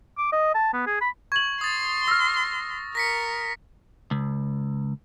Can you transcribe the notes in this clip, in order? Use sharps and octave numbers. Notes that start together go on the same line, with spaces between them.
D6
D#5
A5
B3
G#4
B5
C#6 G#6 F#7
C6 D#6 A6
E6 F6 A#6
A#4 A#6 B6 C#7
C#2